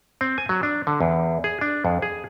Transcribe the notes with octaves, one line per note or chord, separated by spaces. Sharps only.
C4
G#5
F#3
D4
D3
E2
G#4
D4
F2
G#4